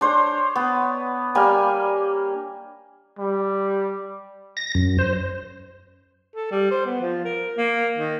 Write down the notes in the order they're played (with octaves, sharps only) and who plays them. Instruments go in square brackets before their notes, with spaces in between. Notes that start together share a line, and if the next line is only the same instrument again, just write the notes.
[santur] D4 C5 C#5
B3
G3 A#3 G#5
[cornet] G3
[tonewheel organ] A#6
F#2
C5
[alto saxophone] A4
G3
C5
B3
F3
A#4
A#3
D#3